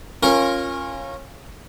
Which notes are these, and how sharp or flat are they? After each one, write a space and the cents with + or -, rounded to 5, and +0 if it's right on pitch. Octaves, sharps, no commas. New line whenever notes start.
C#4 -20 F4 +0 A#4 +0